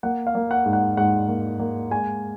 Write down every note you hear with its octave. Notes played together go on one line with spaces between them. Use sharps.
A#3 F#5
F5
A#3
F#5
G#2
F#5
G#2 F#5
A#3
A#3
G#3 G#5